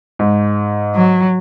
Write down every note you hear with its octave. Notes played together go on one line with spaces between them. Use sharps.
G#2
F#3